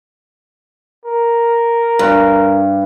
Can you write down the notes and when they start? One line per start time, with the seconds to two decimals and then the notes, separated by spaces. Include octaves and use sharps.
1.06 A#4
1.99 G2